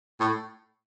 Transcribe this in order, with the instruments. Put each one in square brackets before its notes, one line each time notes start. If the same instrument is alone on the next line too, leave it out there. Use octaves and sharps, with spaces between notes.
[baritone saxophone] A2